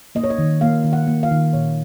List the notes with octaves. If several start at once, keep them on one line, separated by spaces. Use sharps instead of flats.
A#3 D#5
C#5
D#5
D#3
A#3 F5
D#3
F#5
A#3
F5
D#3
A#2 C#5